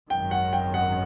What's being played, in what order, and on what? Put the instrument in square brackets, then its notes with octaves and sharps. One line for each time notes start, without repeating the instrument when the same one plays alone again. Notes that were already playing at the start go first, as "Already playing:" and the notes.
[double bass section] G#1 F#2 D#3 [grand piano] G5
[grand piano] F#5
G5
F#5